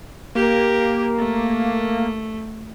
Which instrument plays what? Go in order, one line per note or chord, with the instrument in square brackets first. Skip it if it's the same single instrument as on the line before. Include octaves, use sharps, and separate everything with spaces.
[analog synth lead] A#3 [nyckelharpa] G4 A#4
[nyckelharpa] A3